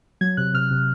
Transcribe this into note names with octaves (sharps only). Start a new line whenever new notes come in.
F#3 G#6
C3 F#6
C3 F6
C3